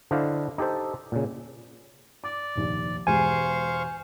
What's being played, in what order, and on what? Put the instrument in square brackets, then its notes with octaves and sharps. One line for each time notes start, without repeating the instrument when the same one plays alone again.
[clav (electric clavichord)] D3 D4 E4 C5 D#5 F5
D#4 G4 A4 C5
A#2 C#3
[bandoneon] D5 [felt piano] D6
[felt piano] F1 A#1 D#2
[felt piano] E1 G#3 G4 [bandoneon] C5 F5 C#6 [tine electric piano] G#5